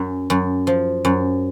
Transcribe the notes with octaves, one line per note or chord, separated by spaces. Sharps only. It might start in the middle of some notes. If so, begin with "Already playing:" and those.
Already playing: F#2
F#2
F3
F#2